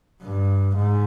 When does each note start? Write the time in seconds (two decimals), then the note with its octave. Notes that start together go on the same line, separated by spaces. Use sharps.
0.22 G2
0.76 G#2